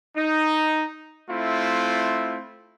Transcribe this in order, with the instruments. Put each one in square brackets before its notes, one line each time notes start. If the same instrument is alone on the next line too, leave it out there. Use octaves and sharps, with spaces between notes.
[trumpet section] D#4
A3 C4 E4 F4